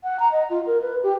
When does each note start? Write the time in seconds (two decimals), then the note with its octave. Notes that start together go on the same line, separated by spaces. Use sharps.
0.04 F#5
0.20 A#5
0.32 D#5
0.50 F4
0.66 A#4
0.82 B4
1.03 G4